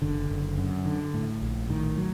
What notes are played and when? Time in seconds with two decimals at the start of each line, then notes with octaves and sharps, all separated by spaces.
0.02 F#1 D3
0.30 F#1
0.58 F#2
0.85 D3
1.14 A2
1.42 A#1
1.70 A2 D#3
1.97 F#3